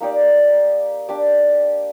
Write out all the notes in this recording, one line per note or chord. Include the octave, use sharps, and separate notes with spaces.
A#3 D#4 G4 D5
D4 G4 D5